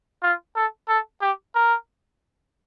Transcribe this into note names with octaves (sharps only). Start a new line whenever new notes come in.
F4
A4
A4
G4
A#4